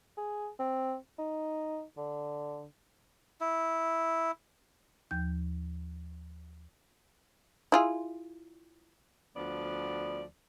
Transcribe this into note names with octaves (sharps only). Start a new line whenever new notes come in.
G#4
C4
D#4
D3
E4
D#2 F3 G6
E4 F4 G#4
D2 F3 B3 D4 D5